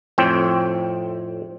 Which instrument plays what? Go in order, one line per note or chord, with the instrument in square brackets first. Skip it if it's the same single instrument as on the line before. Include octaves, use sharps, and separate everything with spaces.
[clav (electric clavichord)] F2 A2 C4 C#5 G5